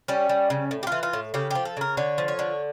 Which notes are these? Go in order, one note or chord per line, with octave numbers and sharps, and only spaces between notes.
G3 C#4
G3
C#3
A2
G4
E3 F4
F4
A2
C#3 G4
F3 G4
A4
C#3 A#4
D3 C#5
F3
C#5
D3